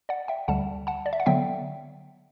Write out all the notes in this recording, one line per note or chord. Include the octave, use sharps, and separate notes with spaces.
D5 F#5
E5 G5
D2 D3 G3 F#5 A5
F#5 A5
D5
E5
F#5
D3 F#3 B3 E5 G5